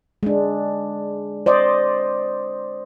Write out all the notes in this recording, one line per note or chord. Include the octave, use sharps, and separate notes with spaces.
G#3 D4
C5 D5 D#5